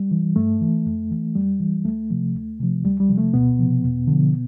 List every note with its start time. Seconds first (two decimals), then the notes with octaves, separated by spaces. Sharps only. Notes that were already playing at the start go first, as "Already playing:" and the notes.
Already playing: G3
0.11 E3
0.36 G2 A3
0.61 E3
0.86 F2
1.11 E3
1.35 F2 G3
1.60 E3
1.85 D2 A3
2.10 C3 F3
2.35 D2
2.59 C3 F3
2.84 D2 G3
3.00 G3
3.09 C3 F3
3.18 A3
3.33 D2 B2 B3
3.59 C3 F3
3.84 E2
4.07 D3 F3